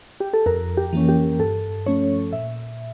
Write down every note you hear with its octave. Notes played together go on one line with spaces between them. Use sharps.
G4
A4
F2 A#4
G4
E3 A#3 C#4
G4
G2 A4
F3 A3 C#4 C#5
A#2 E5